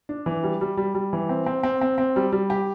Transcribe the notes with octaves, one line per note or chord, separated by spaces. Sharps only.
D4
E3
G3
G3
G3
G3
E3
C4
C4
C4
C4
C4
G3
G3
G4